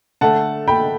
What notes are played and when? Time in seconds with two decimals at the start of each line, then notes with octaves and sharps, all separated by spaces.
0.21 D3 A3 F#5 A5
0.68 G5 B5